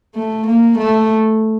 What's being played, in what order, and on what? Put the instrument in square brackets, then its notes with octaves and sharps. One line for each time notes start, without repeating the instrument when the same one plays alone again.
[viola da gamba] A3
A#3
A3